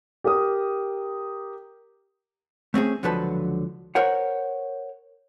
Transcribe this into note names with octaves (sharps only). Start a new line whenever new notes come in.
G4 A#4 D#6
A3 C4 C#4 G#4
C#2 D3 F3 F#3 B4 A5
A#4 C5 C#5 F#5